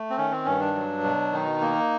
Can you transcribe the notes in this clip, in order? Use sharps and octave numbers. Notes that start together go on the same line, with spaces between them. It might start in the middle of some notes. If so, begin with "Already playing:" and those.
Already playing: A3
C4
D#3 C#4
C4
G2 C#4
D4
F#3
B2
D#3 D#4
A#3